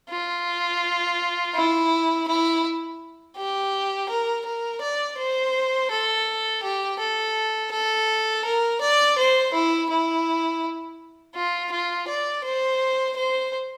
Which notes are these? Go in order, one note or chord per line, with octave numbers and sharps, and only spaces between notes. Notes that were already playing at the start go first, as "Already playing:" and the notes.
F4
E4
E4
G4
A#4
A#4
D5
C5
A4
G4
A4
A4
A#4
D5
C5
E4
E4
F4
F4
D5
C5
C5